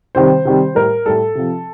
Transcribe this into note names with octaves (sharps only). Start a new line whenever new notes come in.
C3 D#3 G3 C5
C3 D#3 G3
A2 G3 A#4
A2 G3 A4
C3 F3